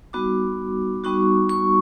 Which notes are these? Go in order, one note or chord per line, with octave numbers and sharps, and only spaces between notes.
G3 B3 D#4 F#4 D6
G3 B3 D#4 F#4 C#6
C#6